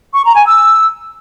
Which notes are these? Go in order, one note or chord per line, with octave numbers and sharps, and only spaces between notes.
C#6
A#5
G#5
E6